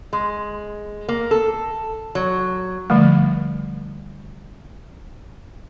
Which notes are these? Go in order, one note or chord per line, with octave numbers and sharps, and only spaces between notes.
G#3
A#3
A4
F#3
D3 F3 G3 A3